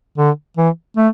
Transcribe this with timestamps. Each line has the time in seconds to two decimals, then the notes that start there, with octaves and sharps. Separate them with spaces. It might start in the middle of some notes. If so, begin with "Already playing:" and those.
0.18 D3
0.57 E3
0.97 A3